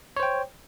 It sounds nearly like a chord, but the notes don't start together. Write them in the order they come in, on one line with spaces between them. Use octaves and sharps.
C#5 C5 G5